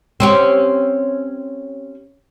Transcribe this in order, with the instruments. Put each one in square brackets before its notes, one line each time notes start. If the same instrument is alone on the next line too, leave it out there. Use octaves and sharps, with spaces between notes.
[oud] C4 C#4 G4